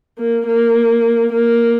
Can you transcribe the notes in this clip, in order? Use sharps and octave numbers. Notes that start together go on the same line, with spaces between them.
A#3
A#3
A#3